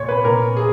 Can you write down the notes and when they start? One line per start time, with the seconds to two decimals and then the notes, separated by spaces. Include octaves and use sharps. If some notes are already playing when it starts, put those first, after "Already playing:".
Already playing: A#2 C#5
0.09 B4
0.24 A#2 A#4
0.57 G#4